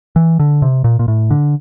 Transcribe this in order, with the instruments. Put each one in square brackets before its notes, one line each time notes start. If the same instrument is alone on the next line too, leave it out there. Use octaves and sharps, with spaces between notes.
[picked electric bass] E3
D3
C3
A#2
A#2
A2
D3